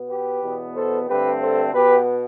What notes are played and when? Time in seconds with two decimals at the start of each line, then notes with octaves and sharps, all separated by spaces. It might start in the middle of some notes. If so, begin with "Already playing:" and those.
Already playing: B2 B3
0.09 G4 B4
0.42 E2 B2 B3
0.75 A4 C5
1.08 G2 D3 A3 C4 G4 B4
1.40 A4 C5
1.73 B2 B3 G4 B4